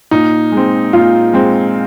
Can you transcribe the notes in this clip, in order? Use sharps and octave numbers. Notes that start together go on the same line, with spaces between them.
A#2 D#4
G#3
C4
A#2 F4
G#3 C4